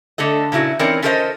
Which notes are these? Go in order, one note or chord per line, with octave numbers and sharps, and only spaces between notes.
D3 A3 A4 D#5
A#2 C#3 E4 F#4
E3 C4 C#4 D#4 A#4 D5
C#4 F4 A4 A#4 C5 D#5